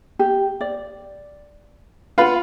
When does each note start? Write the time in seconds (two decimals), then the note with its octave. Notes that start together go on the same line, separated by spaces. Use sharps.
0.19 G4
0.61 D5
2.18 F4 B4 F5 F#5